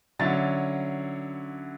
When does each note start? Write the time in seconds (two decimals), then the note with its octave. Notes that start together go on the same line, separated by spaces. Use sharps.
0.19 D3 F#3 C#4 E4 A6